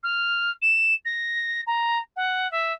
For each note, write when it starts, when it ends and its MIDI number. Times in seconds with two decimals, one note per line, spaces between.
0.03 0.51 89
0.62 0.94 100
1.05 1.61 94
1.67 1.99 82
2.16 2.50 78
2.51 2.73 76